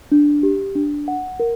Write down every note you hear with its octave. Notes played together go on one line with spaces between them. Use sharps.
D4
G4
D4
F#5
A#4